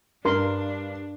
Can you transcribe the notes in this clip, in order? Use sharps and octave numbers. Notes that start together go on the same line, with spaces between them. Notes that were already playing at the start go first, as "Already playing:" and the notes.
G2 D4 A#4 C6